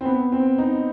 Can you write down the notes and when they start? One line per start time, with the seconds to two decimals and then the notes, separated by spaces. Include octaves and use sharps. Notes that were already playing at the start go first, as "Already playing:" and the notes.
0.01 C4
0.05 B3
0.32 C4
0.58 D#4